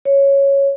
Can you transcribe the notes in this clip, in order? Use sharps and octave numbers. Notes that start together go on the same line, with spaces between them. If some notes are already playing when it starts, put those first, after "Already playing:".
C#5